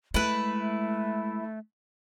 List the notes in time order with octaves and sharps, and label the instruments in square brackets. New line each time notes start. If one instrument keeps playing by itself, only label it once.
[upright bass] G#3 [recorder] A3 [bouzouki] E4 B4